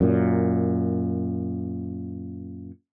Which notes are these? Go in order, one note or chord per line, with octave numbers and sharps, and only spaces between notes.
F#2 A#2